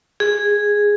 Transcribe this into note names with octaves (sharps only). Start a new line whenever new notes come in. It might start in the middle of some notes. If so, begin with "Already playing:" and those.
G#4